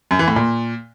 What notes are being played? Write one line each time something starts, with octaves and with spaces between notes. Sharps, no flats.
F#2
E3
A2
A#2